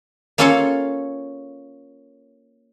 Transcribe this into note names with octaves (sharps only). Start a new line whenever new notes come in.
A#3 C#4 F4 A4 C#5 F5